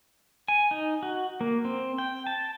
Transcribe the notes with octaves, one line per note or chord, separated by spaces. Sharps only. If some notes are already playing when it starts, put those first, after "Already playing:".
G#5
D#4
F#4
A#3
C4
G5
A5